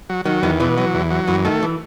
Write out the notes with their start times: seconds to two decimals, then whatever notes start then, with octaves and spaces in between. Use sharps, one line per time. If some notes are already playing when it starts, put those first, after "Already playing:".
0.09 F#3
0.25 D#3 F#3
0.43 E2 D#3
0.60 B2 E3
0.77 E3 F#3
0.94 E2
1.11 F#3
1.28 F#2 E3
1.45 D#3 A3
1.63 E3